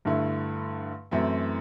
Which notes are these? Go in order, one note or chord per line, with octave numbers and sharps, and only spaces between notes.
G2 D3 A3 E4
F#2 E3 A3 C4 E4